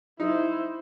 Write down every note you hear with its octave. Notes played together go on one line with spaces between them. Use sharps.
D#4 E4 C5